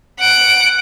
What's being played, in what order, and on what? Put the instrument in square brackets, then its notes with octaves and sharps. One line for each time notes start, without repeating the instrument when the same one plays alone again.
[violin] F#5 D7